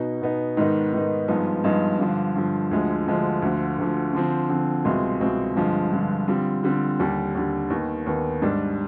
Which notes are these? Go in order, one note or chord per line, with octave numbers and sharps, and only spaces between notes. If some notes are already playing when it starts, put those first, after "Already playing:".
Already playing: B2 B3 D#4
B2 B3 D#4
G#2 D#3 B3 D#4
G#2 D#3 B3 D#4
G2 F3 G#3 B3 D#4
G2 F3 G#3 B3 D#4
G2 D3 F3
G2 D3 F3
D2 D3 F3 G#3
D2 D3 F3 G#3
D2 D3 F3
D2 D3 F3
D3 F3 C4
D3 F3 C4
C2 B2 G#3 C4 F4
C2 B2 G#3 C4 F4
G2 D3 F3 G#3
G2 D3 F3 G#3
D3 G3 C4 F4
D3 G3 C4 F4
D#2 D3 G3
D#2 D3 G3
D#2 D#3 B3
D#2 D#3 B3
G#2 G3 D4